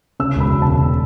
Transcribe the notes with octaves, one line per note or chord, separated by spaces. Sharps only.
C#3 E6
E1
B5
E1
A5
C#3